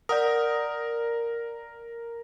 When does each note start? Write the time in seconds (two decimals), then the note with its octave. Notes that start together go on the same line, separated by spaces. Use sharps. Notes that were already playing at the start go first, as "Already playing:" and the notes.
0.09 A#4 D5 F#5 D#6